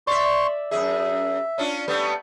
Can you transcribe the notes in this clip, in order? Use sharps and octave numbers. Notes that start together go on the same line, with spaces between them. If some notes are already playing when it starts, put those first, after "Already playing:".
D5 E5 C6 C#6
F#2 C3 G#4 E5
C#4 D4 F4
G3 A3 B3